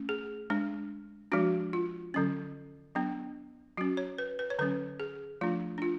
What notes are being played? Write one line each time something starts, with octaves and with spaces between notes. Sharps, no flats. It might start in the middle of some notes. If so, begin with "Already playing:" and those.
Already playing: A3 C#4
G#4
G#3 D4
F3 G#3 D4 F#4
F4
D3 F#3 C#4
F#3 B3 D4
F#3 C#4 F#4
C#5
B4
B4
C#5
D3 F#3 C#4 B4
G#4
F3 A3 D4 F4
D4
F4